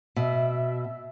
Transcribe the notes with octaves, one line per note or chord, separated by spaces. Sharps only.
B2 E5